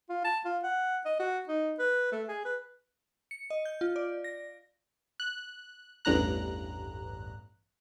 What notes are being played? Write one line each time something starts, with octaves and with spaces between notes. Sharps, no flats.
F4
A5
F4
F#5
D#5
F#4
D#4
B4
A3
G#4
B4
C#7
D#5
G6
F4
D5
A#6
F#6
A1 E2 G2 A#5 F#6